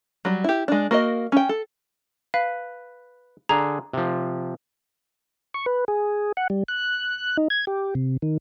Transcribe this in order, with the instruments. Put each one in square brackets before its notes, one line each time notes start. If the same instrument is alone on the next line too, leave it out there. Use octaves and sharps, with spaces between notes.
[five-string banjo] F#3 G3
E4 G4
G#3 D4
A#3 F#4 A#4 C5 D#5
C#4 G5
A4
[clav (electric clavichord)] B4 [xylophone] F5
[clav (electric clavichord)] D3 G#4 [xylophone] A#5
[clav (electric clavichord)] C3 F3
[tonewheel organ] C#6
B4
G#4
F#5
G3
F#6
D#4
G#6
G4
C3
D#3